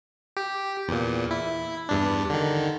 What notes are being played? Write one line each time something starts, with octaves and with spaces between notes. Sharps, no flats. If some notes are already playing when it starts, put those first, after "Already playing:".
G4
E2 A#2
E4
E2 G2 D4
D3 D#3